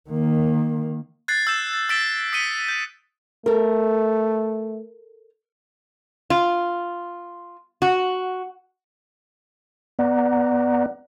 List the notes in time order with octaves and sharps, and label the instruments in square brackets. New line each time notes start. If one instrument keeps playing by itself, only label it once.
[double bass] D#3 A#3
[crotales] F#6 G#6 A6 C7
E6 G6 E7
A6
E6 A6 B6 D7 E7 G7
D#6 B6 C#7 D#7 G7
G6
[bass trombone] A3 [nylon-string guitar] A4 A#4
[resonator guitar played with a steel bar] F4
F#4
[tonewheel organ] B3 D5 F#5 A#5